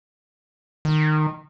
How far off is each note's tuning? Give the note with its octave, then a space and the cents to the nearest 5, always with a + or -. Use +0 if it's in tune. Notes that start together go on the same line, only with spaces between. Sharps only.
D#3 -15